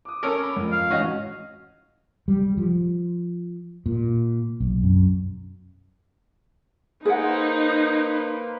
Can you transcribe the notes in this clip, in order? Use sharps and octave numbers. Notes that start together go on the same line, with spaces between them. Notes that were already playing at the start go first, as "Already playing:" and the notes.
D6 D#6
C#4 A4 A#4
B5 D6
F2
F5
A1 G#2 C#4 F#4 D#5
G3
F3
A#2
B1
F#2
A#3 D#4 G#4 B4 C5 F#5